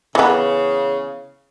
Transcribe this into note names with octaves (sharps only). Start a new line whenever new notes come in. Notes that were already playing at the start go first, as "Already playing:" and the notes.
C#3 E3 B3